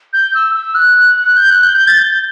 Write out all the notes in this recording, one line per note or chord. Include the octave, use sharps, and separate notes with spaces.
G6
E6
E6
F#6
G6
F#6
G6
G6
A6
G6